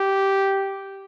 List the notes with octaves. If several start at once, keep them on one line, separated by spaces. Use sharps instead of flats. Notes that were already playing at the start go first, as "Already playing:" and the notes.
Already playing: G4